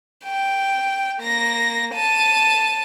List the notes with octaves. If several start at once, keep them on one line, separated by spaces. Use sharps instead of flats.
G5
A#3 A#6
A5 D#7